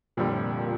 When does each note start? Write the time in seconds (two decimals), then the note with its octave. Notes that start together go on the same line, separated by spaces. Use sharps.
0.17 F1 F2 A#2 D3 G3
0.31 A2
0.44 A#2